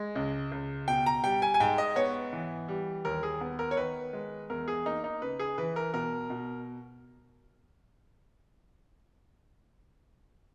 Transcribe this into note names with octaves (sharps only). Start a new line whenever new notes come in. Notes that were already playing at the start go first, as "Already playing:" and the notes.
Already playing: G#3
C#2
C#2
B2 G5
A#5
G3 G5
G#5
G#5
G#2 G5
D#5
B3 C#5
E3
G3
D#2 A#4
G#4
B3
A#4
C#5
D#3 B4
G#3
E2 A#4
G#4
A#3 D#4
D#4
C#3 B4
G#4
E3 B4
A#4
B2 A#4
B2